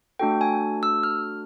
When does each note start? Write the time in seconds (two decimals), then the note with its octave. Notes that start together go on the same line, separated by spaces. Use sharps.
0.19 A3 D4 F#4 A4 G5
0.41 G#5
0.83 E6
1.03 F6